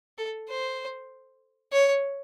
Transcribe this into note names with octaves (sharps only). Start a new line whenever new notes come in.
A4
C5
C#5